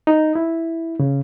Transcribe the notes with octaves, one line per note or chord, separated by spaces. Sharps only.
D#4
E4
C#3